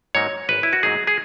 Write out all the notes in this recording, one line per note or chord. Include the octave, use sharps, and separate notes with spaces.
G#2 F#3 A#3 D#4 C#5
G#1 B4
E4
F#4
G#2 F#3 A#3 D#4 G#4
G#4